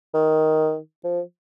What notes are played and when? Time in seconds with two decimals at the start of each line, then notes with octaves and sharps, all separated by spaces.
0.14 D#3
1.04 F3